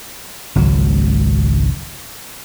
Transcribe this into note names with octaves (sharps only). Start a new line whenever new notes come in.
G#1 C#2 F#3